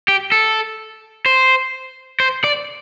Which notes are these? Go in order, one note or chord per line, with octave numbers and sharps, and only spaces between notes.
G4
A4
C5
C5
D5